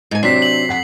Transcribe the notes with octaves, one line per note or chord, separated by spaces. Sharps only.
G#2 G#5
C3 F#3 C4 D4 B6 C7
F#7
F2 F#5 B6